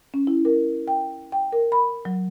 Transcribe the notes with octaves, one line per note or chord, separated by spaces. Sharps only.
C#4
E4
A#4
G5
G5
A#4
B5
F#3